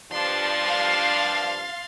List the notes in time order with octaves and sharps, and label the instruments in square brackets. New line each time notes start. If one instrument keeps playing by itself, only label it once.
[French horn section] G2 F3 D4 [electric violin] C6 A6
[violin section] F5